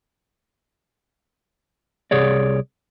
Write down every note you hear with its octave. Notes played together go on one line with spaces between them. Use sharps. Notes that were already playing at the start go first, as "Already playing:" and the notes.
C2 G#4 C#5 D5